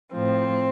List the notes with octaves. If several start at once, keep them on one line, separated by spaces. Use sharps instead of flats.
A2 F3 C4